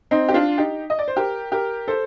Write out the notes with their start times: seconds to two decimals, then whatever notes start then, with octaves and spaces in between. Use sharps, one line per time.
0.11 C4 D#4
0.28 G4
0.34 D4 F4
0.58 D#4 G4
0.90 D#5
0.99 D5
1.08 C5
1.16 G4 A#4
1.52 G4 A#4
1.88 A4 C5